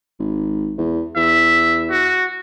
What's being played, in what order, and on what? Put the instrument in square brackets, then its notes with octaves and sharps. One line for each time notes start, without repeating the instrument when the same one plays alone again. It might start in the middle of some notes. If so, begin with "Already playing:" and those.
[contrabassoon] G#1
E2
[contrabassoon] E2 [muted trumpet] E5
[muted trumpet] F#4